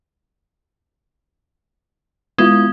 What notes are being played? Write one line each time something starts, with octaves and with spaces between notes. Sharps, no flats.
G#3 B3 E4 F4